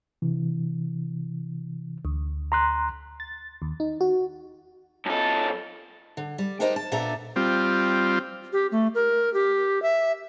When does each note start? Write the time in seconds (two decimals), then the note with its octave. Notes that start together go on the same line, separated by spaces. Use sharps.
0.22 C3 E3
2.05 D2
2.52 A#5 C6 F#6
3.20 A6
3.62 D#2
3.80 D#4
4.01 F#4
5.06 F#2 A4 A5
6.17 D3
6.38 G3
6.60 D4 D#4 G4 A#4 C5 D#5
6.76 A5
6.92 A#2 B3 D4 A4 E5 A#5
7.36 G3 C4 F4
8.53 G4
8.72 A3
8.95 A#4
9.34 G4
9.82 E5